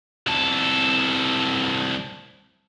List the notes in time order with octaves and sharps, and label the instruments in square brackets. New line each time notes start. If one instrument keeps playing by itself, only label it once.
[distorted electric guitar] C2 A4